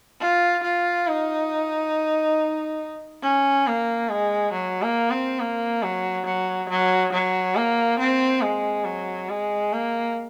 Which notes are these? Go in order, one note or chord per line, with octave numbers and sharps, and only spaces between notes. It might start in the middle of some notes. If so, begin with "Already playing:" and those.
F4
F4
D#4
C#4
A#3
G#3
F#3
A#3
C4
A#3
F#3
F#3
F#3
F#3
A#3
C4
G#3
F#3
G#3
A#3